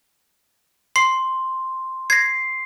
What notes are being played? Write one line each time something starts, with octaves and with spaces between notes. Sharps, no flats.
C6 C7
G#6 A#6 C7